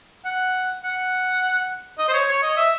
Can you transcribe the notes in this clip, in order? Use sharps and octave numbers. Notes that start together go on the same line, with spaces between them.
F#5
F#5
D#5
C5
C#5
C#5
D#5
E5